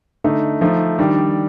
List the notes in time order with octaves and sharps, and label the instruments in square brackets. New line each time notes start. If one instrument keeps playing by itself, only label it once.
[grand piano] D3 A3 D#4
F3 A3 D#4
D#3 G3 D4